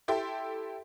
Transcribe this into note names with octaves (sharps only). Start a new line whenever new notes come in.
E4 G4 A4 E5 G5 C6